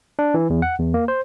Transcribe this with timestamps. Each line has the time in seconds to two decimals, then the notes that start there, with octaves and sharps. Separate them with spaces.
0.19 D4
0.34 E3
0.50 E2
0.62 F#5
0.79 E2
0.94 A#3
1.08 C5